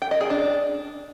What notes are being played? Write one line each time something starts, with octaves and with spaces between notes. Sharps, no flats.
G5
D#5
G#4
D4